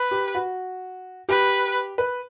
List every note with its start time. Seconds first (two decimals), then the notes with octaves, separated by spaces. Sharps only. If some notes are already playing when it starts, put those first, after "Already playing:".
Already playing: B4
0.11 G4
0.35 F#4
1.29 G4 B4
1.98 B4